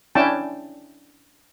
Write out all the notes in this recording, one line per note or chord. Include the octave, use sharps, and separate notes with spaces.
C#4 D4 E4 G5 A5